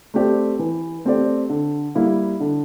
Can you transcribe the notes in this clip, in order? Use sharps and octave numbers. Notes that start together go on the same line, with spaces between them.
A3 C4 G4 D5
E3
A3 C4 G4 D5
D3
G3 A#3 E4
D3